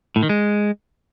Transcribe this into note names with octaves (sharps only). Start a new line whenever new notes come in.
A2
D#3
G#3